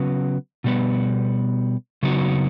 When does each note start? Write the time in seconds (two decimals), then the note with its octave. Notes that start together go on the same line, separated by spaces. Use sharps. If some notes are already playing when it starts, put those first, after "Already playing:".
Already playing: C#3 F#3 B3
0.64 B2 G3 B3
2.03 C#3 F#3 B3 D#4 F#4